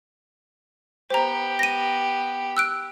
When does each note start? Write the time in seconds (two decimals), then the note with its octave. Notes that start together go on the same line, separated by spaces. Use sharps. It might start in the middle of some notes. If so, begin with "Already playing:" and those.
1.10 B3 G4 C5 A#5
1.59 A#6 D#7
2.57 E6 F#6 D7